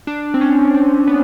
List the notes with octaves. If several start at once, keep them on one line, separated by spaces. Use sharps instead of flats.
D4
C4
C#4
C4
B3